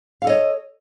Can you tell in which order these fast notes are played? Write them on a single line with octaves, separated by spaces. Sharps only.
F5 A4 D#5 C#5